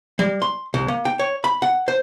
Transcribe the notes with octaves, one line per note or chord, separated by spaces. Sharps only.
G3
C6
C2
A#3
G5
C#5
B5
F#5
C5